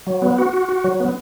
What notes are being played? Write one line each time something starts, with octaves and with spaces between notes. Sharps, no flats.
F#3
B3
F#4
F#4
F#4
F#3
B3